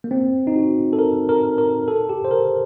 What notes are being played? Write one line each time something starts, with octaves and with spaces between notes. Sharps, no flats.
A#3
C4
D#4
F#4
A4
A#4
A#4
A#4
A4
G4
C5
A#4